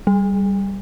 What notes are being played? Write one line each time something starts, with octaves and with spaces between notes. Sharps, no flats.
G3